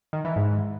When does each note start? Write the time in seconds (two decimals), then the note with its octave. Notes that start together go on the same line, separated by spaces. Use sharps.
0.13 D#3
0.25 E3
0.36 G#2